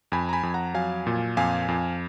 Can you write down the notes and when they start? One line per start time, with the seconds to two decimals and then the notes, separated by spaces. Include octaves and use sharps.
0.12 F2 G#5 B5
0.29 A#5
0.33 G#5 B5
0.43 F2
0.54 F#5 A#5
0.74 F#3 F5 G#5
1.07 A#2
1.37 F2 F5 G#5
1.68 F2